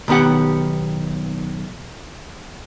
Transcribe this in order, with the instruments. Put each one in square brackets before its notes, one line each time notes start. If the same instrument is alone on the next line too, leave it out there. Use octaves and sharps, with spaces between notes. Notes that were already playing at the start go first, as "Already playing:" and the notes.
[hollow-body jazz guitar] B1 D#3 B3 G4 F#5